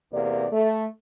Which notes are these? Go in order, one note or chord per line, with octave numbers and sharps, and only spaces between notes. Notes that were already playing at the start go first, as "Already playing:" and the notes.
E2 C3 A#3 D5
A3